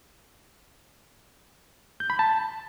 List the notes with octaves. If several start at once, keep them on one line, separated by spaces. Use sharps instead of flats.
G6
B5
A5